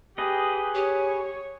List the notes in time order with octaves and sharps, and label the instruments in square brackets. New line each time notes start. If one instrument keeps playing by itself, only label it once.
[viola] G4 [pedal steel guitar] G#4 B4 D#5
[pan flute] G4 [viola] C#5